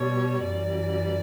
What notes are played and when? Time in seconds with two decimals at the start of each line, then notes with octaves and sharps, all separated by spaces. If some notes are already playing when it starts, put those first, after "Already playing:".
Already playing: B2 G3 C#5
0.42 F#2 E3 G3 D5